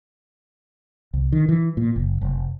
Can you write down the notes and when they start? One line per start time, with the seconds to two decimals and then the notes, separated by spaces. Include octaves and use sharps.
1.14 C2
1.32 D#3
1.49 E3
1.77 A#2
1.96 F#1
2.21 F1